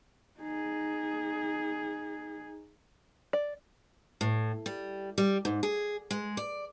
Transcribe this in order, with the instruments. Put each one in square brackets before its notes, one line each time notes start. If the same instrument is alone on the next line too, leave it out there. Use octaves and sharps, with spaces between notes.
[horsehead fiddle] D#4 G#4
[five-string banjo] D5
[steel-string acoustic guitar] A2
G3
G3
G#2
G#4
G#3
D5